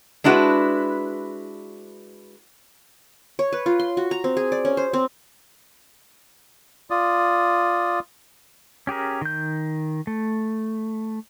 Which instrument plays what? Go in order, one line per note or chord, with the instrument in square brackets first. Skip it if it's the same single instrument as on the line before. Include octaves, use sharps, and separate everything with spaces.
[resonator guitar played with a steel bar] G#3 D4 E4 F#4 B4
[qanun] C#5
B4
F4
C6
F#4
A#5
C4
G#4
D5
C#4
C5
C4
[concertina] F4 D5 D#6
[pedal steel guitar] C#4 G4 G#4 A#4
D#3 G6
A3